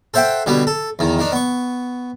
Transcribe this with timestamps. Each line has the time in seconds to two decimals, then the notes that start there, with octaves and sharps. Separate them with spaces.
0.14 A4 C5 E5 F#5 G5
0.46 B2 D3 G3 B3
0.67 A4
0.99 E2 D#3
1.19 D#3 D4
1.32 B3 C#6